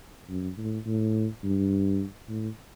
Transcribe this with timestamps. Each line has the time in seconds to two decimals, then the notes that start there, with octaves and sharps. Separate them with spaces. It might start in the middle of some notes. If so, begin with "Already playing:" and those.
0.29 F#2
0.57 A2
0.86 A2
1.44 G2
2.28 A2